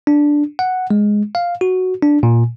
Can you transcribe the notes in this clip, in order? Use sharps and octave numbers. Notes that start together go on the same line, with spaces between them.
D4
F#5
G#3
F5
F#4
D4
A#2